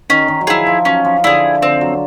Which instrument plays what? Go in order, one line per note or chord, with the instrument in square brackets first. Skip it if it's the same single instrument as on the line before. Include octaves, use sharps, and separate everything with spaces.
[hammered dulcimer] D#3 [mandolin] C#4
[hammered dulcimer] D#3
F#3
[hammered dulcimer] F3 [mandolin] E4 G#4
[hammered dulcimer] F3
[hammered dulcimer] F#3 [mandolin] C#4
[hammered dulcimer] F3
[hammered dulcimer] D3 [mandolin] E4 G#4
[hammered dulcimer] D3 [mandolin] C4
[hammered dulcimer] F#3